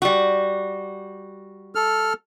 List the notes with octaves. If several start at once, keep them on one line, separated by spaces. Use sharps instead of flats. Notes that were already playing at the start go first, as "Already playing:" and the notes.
G3 F#4
A4 F6